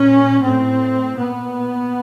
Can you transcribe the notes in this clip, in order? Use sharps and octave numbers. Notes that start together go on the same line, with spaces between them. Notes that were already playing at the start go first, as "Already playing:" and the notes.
Already playing: A#2 C#4
A2 C4
A#2 B3